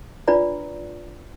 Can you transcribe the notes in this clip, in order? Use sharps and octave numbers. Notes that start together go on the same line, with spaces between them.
D4 F4 B4 D5 A#5